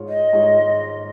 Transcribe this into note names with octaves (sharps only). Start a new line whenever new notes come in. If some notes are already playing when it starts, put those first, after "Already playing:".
Already playing: G#2 G#3 F4 C#5
D#5
G#2 G#3 F4 C#5